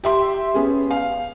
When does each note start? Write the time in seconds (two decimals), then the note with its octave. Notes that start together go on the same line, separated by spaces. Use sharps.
0.04 G4 E5 C6
0.54 B3 C#4 G#4
0.91 F5